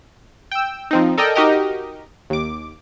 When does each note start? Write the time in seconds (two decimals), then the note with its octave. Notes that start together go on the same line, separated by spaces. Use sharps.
0.51 G5 E6
0.91 F3 C4 D#4
1.18 A4 A#4 D5 D#5 G5
1.35 D#4 F#4 G4 A#4 D#5
2.30 D#2 D6